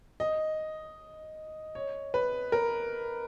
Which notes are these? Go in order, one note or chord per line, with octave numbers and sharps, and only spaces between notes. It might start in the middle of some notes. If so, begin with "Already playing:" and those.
D#5
C#5
B4
A#4